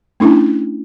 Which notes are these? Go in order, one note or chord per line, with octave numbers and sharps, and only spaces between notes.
A3 C#4 D4 E4